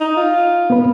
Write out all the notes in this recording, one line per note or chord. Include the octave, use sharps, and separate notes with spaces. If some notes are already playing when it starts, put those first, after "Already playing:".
D#4
F4
B3 B4